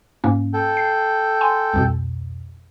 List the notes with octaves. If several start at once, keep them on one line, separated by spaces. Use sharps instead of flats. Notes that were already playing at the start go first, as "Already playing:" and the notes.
G#2 A#3 C#4
A4 G5
C7
G#5 C6
C2 F2 B2